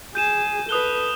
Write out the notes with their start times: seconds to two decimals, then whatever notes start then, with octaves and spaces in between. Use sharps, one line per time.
0.15 G#4 G6 D#7 E7
0.69 A4 B4 D#6 F#6 G7